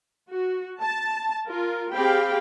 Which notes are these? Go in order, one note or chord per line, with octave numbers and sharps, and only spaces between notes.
F#4
A5
F4 A#4
C4 G4 G#4 F5 G5 B5